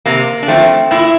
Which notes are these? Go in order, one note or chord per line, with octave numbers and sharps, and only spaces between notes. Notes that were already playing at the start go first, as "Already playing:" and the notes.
C3 A#3
D4
F3 A3 C4
A#2 E4